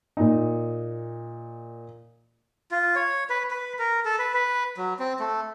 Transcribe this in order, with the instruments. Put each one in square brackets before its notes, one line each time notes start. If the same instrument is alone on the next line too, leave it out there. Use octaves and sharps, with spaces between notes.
[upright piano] A#2 D#4
[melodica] F4
C#5
B4
B4
A#4
A4
B4
B4
F#3
C4
A3